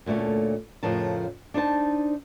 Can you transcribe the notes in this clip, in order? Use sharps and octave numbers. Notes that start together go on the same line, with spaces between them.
D2 A#2 G#3 A3 C#4
F2 A2 C#3 F3 A#4 A5
D4 D#4 C5 A5